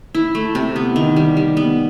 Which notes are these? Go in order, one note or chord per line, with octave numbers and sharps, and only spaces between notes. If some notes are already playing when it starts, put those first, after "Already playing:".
E4
A3
C3
B3
D#3
G3
G3
B3